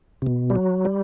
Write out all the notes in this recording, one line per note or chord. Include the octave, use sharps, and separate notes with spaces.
C3
B2
G3
F#3
G3